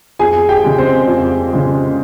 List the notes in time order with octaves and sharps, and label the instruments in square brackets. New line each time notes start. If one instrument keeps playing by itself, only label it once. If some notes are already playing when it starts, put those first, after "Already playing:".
[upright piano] F2 [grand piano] G#4 G#5
[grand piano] G4 G5
[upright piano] C#3 G#3
[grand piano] C4 C5
[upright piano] F2
C#3 G#3